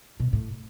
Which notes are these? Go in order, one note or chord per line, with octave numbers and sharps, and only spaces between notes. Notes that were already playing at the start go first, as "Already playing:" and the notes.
B2
A2